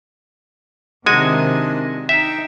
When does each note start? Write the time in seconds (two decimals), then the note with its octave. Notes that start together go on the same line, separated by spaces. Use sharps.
1.06 C3 D#3 G#3 D4 F#4 D#5 G#5
2.09 D#4 E5 G5 E6